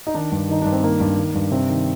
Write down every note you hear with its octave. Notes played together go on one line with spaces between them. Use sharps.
D#4
D#3 D4
G2
D#3 D#4
G2 D4
C4
D#3 A#3
G2
D#3
G2
C3 C4
D#3